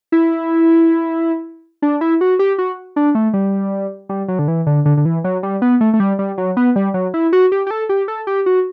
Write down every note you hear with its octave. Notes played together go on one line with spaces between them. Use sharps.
E4
D4
E4
F#4
G4
F#4
D4
A3
G3
G3
F#3
D3
E3
D3
D3
D3
E3
F#3
G3
B3
A3
A3
G3
G3
F#3
B3
G3
F#3
E4
F#4
G4
G4
A4
G4
A4
G4
F#4